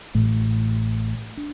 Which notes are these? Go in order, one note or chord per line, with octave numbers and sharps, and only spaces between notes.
A1 A2 A3
D4